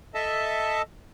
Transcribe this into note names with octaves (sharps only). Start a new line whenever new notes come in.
A4 D#5 E5 A5